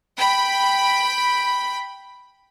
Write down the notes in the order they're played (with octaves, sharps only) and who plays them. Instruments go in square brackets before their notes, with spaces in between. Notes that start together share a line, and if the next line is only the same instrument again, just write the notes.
[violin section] G5 B5